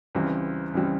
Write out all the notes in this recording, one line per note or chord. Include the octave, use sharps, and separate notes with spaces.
C#2 C#3 E3 G3 C4
C#2 C#3 E3 G3 C4